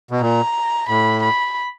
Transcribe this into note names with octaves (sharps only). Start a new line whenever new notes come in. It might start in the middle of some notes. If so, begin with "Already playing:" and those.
B2
A#2 A#5
A2 B5
B5